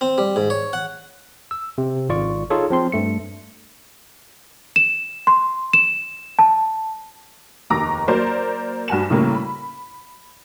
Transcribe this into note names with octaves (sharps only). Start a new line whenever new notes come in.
C4
G3
G#2
C#5
F#5
E6
C3
G#1 F4 D5 C#6
D#4 F4 G#4 A4 C#5
F3 C4 C6
G2 A3 C#7
E7
C6
E7
A5
F1 D#2 A#5 D6 A#6
F#3 A#3 A#4 C5 D5
G2 F#4 G#5 E7
A2 C#3 G3 A#3
B5